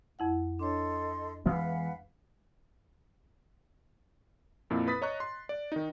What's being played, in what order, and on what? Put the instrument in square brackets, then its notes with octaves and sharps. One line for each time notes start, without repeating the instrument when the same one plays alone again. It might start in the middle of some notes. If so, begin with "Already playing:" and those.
[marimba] F2 E4 F#5
[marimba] D4 C#5 [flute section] A4 D#5 C6
[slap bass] E3 G#3 B3 [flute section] B4 F5 F#5
[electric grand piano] F2 A#2 E4
B4 B5 D#6 A6 B6
C#5 D#5 A#5 C#6 F#6
C6
D5
D#3 D#4